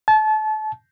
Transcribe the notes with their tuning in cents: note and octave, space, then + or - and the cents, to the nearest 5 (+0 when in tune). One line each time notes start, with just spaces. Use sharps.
A5 -30